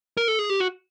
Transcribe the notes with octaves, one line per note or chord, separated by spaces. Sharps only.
A#4
A4
G#4
G4
F#4